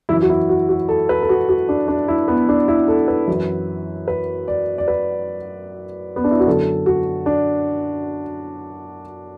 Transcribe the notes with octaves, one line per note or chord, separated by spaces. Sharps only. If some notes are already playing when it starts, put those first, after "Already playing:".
F#2 E3 E4
F#4
E4
F#4
F#4
A4
B4
A4
F#4
F#4
D4
D4
E4
B3
D4
E4
A4
B4
F#2 E3
B4
D5
D5
B4
B3
D4
E4
F#4
F#2 D3 F#3 A4
F#4
D4